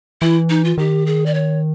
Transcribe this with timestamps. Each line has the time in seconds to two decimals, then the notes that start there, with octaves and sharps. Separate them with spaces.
0.22 E3 E4
0.50 D#4
0.64 F4
0.78 D#3 G4
1.06 G#4
1.26 D5
1.34 C#5